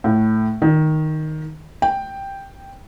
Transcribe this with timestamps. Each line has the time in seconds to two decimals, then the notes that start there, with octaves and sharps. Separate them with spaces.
0.04 A2
0.62 D#3
1.82 G5